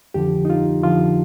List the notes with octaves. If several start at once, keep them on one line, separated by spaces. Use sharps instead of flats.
F2 D3 F3 G4
D#4
F4
F2 D3 F3 F4